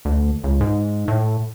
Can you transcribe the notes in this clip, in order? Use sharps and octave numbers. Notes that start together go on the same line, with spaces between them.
D2
C#2
G#2
A2